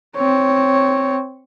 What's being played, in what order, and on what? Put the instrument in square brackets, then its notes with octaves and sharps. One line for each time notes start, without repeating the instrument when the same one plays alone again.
[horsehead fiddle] C4 C#5